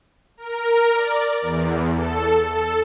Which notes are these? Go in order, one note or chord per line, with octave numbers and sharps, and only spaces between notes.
A#4
D5
E2
A4
A4